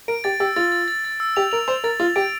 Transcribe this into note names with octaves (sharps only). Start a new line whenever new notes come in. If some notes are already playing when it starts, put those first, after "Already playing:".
A#4 D7
G4 A6
G4 E6
F4 A6
A6
A6
A6
E6
G4 F7
A#4 F7
C5 F7
A#4 A6
F4 A6
G4 D7